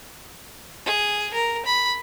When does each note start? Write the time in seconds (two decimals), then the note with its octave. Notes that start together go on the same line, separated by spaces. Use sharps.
0.86 G#4
1.34 A#4
1.66 B5